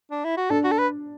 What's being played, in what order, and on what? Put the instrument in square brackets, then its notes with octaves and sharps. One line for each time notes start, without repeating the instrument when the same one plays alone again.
[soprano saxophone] D4
E4
F#4
[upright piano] D4 [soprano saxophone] A4
[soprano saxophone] F#4
A4
B4